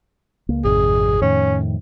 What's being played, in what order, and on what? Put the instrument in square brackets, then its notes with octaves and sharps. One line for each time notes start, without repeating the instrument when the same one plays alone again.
[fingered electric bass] C#2 A#3
[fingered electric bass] G#1 F2 C3 [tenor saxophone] G#4
[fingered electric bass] F2 A2 D#3 [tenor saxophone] C#4